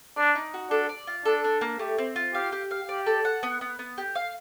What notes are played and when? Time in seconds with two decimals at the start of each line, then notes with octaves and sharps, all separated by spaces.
0.17 D4 D5
0.35 D#4
0.54 F#4
0.71 D4 A4
0.89 D5
1.07 F4
1.25 D4 A4
1.44 D4
1.61 A#3
1.79 A3 G4
1.98 C4
2.16 F4
2.34 G4 F5
2.52 G4
2.71 F5
2.88 G4 D5
3.06 A4
3.25 F#5
3.43 B3
3.61 B3
3.79 B3
3.98 G4
4.15 F5